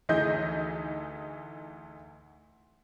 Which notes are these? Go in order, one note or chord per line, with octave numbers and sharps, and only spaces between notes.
D2 E3 D#4 G#4 D#5 G6